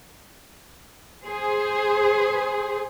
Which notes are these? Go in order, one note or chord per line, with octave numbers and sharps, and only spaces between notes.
G#4 C5